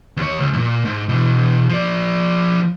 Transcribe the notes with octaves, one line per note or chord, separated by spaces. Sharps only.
D#2 C#5
C#2
F2 A#2
G#2
B2 E3
F3 D5